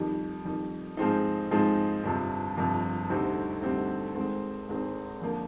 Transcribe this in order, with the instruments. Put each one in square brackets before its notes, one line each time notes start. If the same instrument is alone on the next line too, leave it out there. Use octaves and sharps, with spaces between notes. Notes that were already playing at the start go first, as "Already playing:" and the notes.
Already playing: [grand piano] F2 D#3 G3
F2 D#3 G3
G#2 F3 G#3 C4 D#4
G#2 F3 G#3 C4 D#4
G1 F2 C3 F3
G1 F2 C3 F3
D2 C3 G3 C4 D#4
D2 C3 G3 C4 D#4
G#1 G#2 D#3 G#3 C4
G#1 G#2 D#3 G#3 C4
F2 D3 F3 A#3